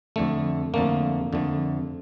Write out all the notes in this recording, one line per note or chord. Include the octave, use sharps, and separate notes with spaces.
F2 D3 A3
F2 D3 A3 A#3
F2 D3 A3